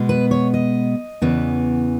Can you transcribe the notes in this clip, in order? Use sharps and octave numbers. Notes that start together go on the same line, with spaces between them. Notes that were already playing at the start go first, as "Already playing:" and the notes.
Already playing: B2 G#3 B3
B4
C#5
D#5
E2 C#3 E3 B3